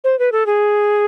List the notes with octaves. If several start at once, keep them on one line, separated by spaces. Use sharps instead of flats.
C5
B4
A4
G#4